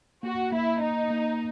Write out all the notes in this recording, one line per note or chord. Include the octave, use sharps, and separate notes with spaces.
A#3 F#4
A#3 E4
A#3 D#4
A#3